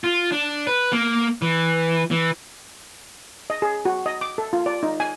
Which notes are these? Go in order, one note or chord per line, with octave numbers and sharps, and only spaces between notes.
F4
D4
B4
A#3
E3
E3
D#5
G#4
F#4
D#5
D6
A4
F4
D5
D#4
G#5